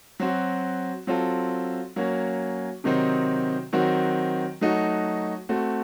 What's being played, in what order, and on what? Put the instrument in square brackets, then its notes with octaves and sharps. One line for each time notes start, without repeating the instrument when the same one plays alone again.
[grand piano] F#3 C4 F#4
F#3 C4 F4 A4
F#3 A#3 C#4
C3 D#3 F#3 C4 D#4
D#3 F#3 C4 F#4
F#3 A3 D#4 F#4
A3 C4 F#4